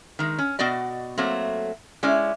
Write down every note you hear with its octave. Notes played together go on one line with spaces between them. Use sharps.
D#3 G#3
C#4
B2 B3 F#4 D5 D#5
F#3 A3 A#3 C4
G#3 C#4 E4 D5